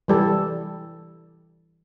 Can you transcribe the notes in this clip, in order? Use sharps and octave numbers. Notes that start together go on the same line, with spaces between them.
E3 G3 A4